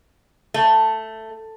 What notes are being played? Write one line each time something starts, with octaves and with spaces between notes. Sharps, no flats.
A3